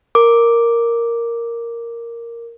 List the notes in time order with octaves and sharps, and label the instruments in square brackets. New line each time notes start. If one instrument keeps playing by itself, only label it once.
[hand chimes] A#4 D6